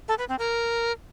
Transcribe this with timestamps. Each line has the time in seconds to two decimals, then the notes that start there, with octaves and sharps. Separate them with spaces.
0.08 A4
0.18 B4
0.29 C4
0.39 A#4